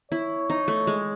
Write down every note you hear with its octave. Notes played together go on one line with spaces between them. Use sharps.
E4 C#5
D#4
A3
G#3